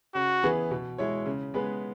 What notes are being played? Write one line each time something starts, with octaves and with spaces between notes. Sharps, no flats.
C#3 F#4
E3 B3 G#4 B4
B2
G#3 E4 C#5
C#3
G#3 B3 G#4 B4